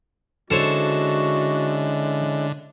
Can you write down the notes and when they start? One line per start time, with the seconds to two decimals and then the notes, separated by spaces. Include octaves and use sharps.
0.51 D3 G#3 C#4 E4 F#4 A4 C5 C#5